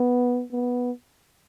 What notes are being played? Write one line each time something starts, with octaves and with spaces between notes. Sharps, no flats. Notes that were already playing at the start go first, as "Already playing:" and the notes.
Already playing: B3
B3